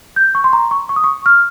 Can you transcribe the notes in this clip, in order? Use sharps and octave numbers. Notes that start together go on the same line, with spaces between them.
G6
C#6
C6
A#5
C#6
C#6
D#6
C#6
F6